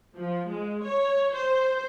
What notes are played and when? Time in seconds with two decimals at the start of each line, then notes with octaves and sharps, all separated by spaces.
0.16 F3
0.47 G#3
0.85 C#5
1.34 C5